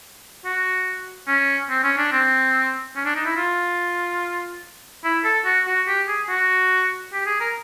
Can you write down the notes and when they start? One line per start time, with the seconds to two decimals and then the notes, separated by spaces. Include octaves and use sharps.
0.45 F#4
1.28 C#4
1.70 C4
1.84 C#4
1.98 D4
2.12 C4
2.96 C#4
3.05 D4
3.16 D#4
3.26 E4
3.36 F4
5.04 E4
5.24 A4
5.45 F#4
5.67 F#4
5.88 G4
6.08 G#4
6.29 F#4
7.13 G4
7.26 G#4
7.40 A#4